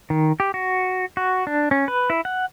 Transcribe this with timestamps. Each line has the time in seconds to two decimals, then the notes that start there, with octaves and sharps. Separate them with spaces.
0.10 D#3
0.40 G4
0.54 F#4
1.17 F#4
1.47 D4
1.71 C#4
1.88 B4
2.10 E4
2.25 F#5